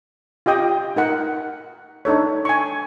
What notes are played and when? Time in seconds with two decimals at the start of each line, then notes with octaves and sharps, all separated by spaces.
0.46 F4 G4 D#5 G5 D#6
0.96 D#4 A#4 F#5
2.05 D4 D#4 A4 C#5
2.45 G#5 C#6